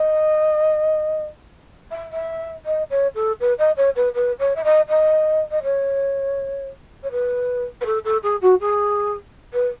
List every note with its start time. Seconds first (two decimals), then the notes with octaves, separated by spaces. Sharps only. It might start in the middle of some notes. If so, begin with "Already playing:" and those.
Already playing: D#5
1.91 E5
2.12 E5
2.66 D#5
2.90 C#5
3.15 A4
3.40 B4
3.59 D#5
3.77 C#5
3.96 B4
4.15 B4
4.39 C#5
4.56 E5
4.64 D#5
4.89 D#5
5.51 D#5
5.63 C#5
7.03 C#5
7.11 B4
7.81 B4
7.86 A4
8.05 A4
8.23 G#4
8.42 F#4
8.60 G#4
9.53 B4